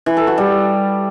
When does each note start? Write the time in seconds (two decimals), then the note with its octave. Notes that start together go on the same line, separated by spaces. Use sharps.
0.06 E3
0.17 A4
0.27 F#4
0.38 G3